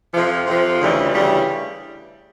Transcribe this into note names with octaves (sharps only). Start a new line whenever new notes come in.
F2 C3 F3
F2 C3 F3
D2 C#3 E3 G3
D2 C#3 E3 G3